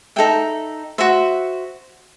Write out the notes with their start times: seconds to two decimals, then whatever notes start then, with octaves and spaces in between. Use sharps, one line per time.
0.16 D#4 A4 E5 G5
0.98 F#4 C5 E5